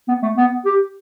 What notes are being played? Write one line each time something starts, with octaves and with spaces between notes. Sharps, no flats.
B3
A3
B3
G4